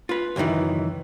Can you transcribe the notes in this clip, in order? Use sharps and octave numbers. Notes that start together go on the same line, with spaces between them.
F4 B4
C#2 F#2 C3 D#3 E3